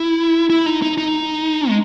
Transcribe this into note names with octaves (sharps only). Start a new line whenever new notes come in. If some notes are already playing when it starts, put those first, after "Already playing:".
Already playing: E4
E4
D#4
D#4
D#4
G#3